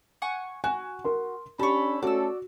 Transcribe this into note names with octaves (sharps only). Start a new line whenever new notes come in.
F#5 G#5 C#6
F#4 G#5
A#4 C6
C#4 D4 G4 A4 C#5 B5
A3 C#4 F#4 A4 D5 E6